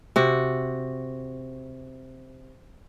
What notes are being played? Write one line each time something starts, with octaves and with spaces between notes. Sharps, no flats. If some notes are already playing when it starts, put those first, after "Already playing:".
C3 F#4